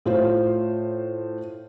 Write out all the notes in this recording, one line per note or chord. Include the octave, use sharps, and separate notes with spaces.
A2 F4 C5